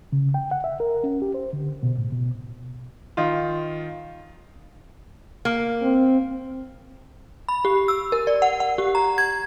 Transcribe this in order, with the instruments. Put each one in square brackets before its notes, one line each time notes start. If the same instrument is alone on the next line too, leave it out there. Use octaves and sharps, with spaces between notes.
[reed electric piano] C#3
G5
F#5
E5
A#4
C#4
G4
C5
D3
B2
A2
B2
[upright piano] D#3 F4
[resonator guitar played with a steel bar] A#3
[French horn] C4
[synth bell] B5
G4
E6
A#4
D5
F#5
F#5
G4
A#5
G#6